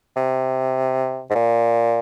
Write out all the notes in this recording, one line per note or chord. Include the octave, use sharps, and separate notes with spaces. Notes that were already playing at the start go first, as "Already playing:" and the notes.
C3
G#2
A#2